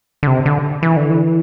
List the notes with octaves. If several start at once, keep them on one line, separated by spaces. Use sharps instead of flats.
D3
C3
D3
E3
D3
E3